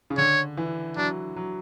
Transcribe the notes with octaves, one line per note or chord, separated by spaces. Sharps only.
C#3
D3 C#5
E3
F#3 D4
F#3